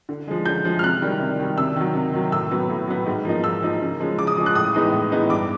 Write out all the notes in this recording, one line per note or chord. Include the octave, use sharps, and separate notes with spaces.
D3
F3 G#3
D3 G6
F3 G#3
F6
C3 F#6
D#3 G3
C3
D#3 G3
C3 E6
D#3 F#3
C3
D#3 F#3
A2 E6
F#3 B3
A2
F#3 B3
G#2
F3 A#3 D#4
G#2 E6
F3 A#3 D#4
C#3
F3 G#3 C#4
C#3 D6
D#6
F3 G#3 C#4
F#6
A2 D#6
E3 G#3 B3 D#4
A2
E3 G#3 B3 D#4
G2 D6